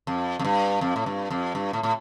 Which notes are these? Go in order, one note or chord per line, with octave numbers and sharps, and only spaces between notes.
F2
F2
G2
F2
A2
G2
F2
G2
A2
A2